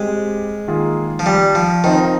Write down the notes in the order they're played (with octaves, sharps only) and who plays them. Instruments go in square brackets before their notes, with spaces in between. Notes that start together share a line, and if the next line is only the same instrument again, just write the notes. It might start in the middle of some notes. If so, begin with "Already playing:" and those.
Already playing: [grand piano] G3 C4 G4 [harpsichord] G#3
[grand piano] D#3 A#3 F4 G#4
[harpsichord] F3
G3
F3
[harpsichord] D#3 [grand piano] F3 C4 D#4